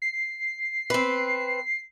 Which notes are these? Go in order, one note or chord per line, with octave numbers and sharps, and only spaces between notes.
C7
C4 B4